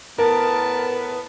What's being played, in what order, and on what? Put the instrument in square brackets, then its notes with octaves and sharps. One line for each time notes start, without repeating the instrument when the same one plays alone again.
[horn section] A2 B3 [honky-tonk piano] A#4 [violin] A5